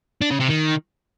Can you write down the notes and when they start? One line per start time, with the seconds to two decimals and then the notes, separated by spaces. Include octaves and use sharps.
0.21 D4
0.31 C#3
0.40 C3
0.50 D#3